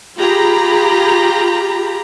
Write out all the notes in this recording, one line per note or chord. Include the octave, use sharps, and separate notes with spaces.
F4 G4 G#4 A#5 B5